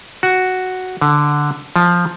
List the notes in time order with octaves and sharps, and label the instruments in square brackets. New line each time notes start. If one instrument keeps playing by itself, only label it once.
[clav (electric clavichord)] F#4
D3
F3